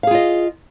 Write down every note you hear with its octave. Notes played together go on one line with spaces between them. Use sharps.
F4 G#4 D#5 F5